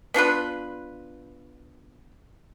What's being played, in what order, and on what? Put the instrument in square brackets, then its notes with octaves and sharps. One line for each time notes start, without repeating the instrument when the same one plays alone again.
[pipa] B3 D4 F4 B4